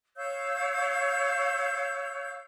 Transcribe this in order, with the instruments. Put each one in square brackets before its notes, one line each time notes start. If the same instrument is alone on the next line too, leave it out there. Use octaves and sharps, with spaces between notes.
[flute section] C#5 F5 E6 G6